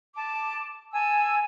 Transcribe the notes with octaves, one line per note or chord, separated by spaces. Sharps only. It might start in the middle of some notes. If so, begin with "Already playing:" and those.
A5 D6
G#5 A5 E6